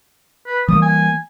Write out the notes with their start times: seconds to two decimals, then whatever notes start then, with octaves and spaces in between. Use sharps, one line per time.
0.46 B4
0.68 E3 G3 A#3 D#6
0.82 G#5